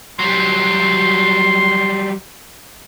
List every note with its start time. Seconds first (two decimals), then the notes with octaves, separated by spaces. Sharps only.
0.19 F#3 G3 C6